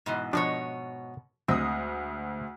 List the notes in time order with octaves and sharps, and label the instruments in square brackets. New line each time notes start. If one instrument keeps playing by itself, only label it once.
[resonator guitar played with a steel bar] G#2 B2 E3
[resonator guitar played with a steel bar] G#2 B2 C#5 [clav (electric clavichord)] F3 D4
[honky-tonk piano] D2 D#6 [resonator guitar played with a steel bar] G#3 [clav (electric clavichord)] C4